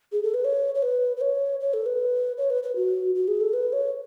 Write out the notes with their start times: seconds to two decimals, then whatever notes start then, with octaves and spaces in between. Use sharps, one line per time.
0.12 G#4
0.23 A4
0.34 B4
0.44 C#5
0.75 C#5
0.82 B4
1.17 B4
1.21 C#5
1.60 C#5
1.73 A4
1.86 B4
2.38 C#5
2.50 B4
2.63 B4
2.76 F#4
3.15 F#4
3.28 G#4
3.41 A4
3.53 B4
3.73 C#5